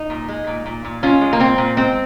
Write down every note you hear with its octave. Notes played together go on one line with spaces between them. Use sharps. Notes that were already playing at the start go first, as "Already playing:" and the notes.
Already playing: D#4
A#2
G#3
A#2
A#2
A#2
G#3 C#4 F4
G#3
A#3
A#2 C4
A#2
G#3 C4